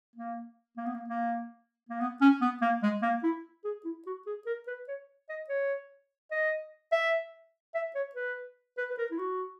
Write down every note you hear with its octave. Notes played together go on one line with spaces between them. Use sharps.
A#3
A#3
B3
A#3
A#3
A#3
B3
C#4
B3
A#3
G#3
A#3
E4
G#4
E4
F#4
G#4
A#4
B4
C#5
D#5
C#5
D#5
E5
E5
C#5
B4
B4
B4
A#4
E4
F#4